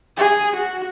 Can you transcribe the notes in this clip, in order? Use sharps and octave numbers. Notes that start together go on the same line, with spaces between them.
G#4
F#4